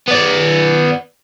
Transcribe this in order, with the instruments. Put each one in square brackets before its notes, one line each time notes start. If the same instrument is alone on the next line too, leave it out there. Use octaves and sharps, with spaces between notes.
[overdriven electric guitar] B3 D5